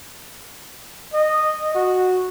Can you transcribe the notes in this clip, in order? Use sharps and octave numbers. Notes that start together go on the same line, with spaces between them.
D#5
F#4